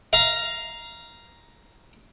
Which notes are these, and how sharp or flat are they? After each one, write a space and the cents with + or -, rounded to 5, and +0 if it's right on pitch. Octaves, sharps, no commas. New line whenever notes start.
F5 -10 A#5 +10